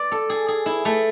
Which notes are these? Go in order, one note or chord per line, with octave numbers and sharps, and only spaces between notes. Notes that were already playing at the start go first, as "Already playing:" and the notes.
Already playing: D5
A4
G#4
G#4
E4
A3